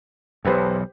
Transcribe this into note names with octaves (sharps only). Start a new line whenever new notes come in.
B1 E2 G4 B4 C5